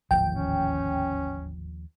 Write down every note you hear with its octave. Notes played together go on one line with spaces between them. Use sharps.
D1 G#1 D#2 F3 G5
C#4